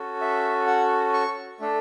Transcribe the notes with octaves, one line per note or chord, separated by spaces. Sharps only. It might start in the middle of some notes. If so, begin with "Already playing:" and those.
Already playing: C#4 F#4 A4
E5
F#5
C#6
A3 D4 A4